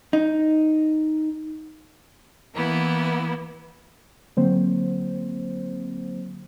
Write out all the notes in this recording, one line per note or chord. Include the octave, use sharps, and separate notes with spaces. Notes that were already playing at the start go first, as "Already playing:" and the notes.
D#4
E3 A#3 B3 E4
D3 F#3 A#3 C4 C5